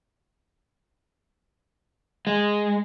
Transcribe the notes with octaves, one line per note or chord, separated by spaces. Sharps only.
G#3